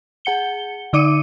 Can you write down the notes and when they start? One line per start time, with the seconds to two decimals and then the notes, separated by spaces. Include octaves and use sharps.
0.25 G#4 F#5 C#7 G7
0.93 D3 D#4 D5 D6 C#7 D#7